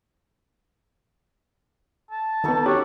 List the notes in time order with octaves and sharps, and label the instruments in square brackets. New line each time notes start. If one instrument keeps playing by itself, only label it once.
[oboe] A5
[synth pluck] D#3 B3 [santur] D#4 A4 C#6
[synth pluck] C#4 [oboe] F#4 [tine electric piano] G4